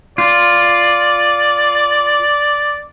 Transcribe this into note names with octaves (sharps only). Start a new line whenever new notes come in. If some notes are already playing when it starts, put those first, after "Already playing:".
F4 D5